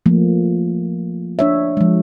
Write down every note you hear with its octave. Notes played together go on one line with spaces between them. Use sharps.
F3 A3 A#3
D4 C#5 E5
F3 G#3